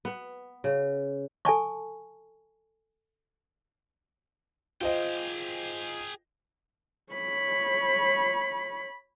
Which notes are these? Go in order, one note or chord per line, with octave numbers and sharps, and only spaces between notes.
B3
C#3
A4 G#5 A5 C#6
F4 G#4 C5 D#5 G5
C#5 B5